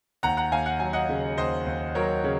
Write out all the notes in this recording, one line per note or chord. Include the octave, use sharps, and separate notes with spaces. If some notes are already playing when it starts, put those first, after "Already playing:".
D#2 F#5 A#5
F#5 A#5
D#2 F5 G#5
F#5
F#3 G#5
D#5 F#5
C#3
D#2 C5 D#5
D#2
F#3 A#4 C#5
C#3